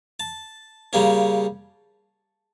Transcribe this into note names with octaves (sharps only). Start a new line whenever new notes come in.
A5
C#3 G3 A#3 C#4